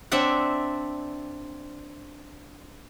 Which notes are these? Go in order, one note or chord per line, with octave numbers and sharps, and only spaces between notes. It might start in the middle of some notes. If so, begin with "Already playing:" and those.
C4 D4 E5 F#5